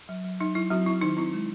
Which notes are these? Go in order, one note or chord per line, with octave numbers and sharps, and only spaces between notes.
F#3
F#3
F#3 D#4
F#3 E4
F#3 C4 F#4
C4 E4
D#3 D#4
C4 E4
G#3